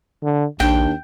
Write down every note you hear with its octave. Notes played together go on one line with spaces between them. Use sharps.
D3
A#1 D#2 D4 G5